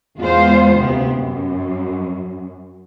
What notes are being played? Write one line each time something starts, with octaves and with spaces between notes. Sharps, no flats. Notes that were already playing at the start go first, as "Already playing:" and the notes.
E2 G#3 B3 F4 C5
D2 C3 B3
F#2